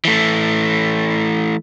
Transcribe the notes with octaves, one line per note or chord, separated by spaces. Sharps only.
E3 A3